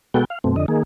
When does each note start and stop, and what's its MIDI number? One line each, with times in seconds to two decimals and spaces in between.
0.14 0.25 47
0.14 0.25 56
0.14 0.25 59
0.14 0.25 66
0.14 0.25 69
0.14 0.25 79
0.30 0.39 77
0.44 0.56 42
0.44 0.56 47
0.44 0.56 57
0.44 0.56 60
0.56 0.66 41
0.56 0.66 50
0.56 0.66 75
0.68 0.83 51
0.68 0.83 58
0.68 0.83 68